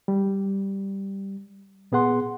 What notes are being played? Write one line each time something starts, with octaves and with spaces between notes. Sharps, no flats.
G3
A#2 B3 G#4 F#5 C6